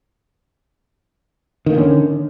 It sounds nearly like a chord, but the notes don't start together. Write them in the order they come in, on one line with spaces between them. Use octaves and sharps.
D#3 A#3 D3 C#4